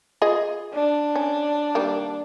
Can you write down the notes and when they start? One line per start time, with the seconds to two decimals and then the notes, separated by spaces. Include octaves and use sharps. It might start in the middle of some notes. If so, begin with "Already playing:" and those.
0.22 F4 G#4 D#5
0.73 D4
1.16 C#4
1.75 D#3 G3 A#3